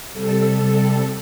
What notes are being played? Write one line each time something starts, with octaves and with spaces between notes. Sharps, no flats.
C3 G3 A4